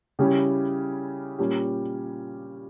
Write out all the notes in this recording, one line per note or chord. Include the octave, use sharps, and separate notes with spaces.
C#3 G3 C#4 E4 G4
A#2 G3 C#4 G4